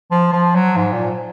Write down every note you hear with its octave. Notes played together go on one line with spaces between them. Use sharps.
F3
F3
F#3
G#2
A#2